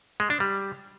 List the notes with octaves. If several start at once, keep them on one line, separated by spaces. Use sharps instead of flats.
G#3
D4
G3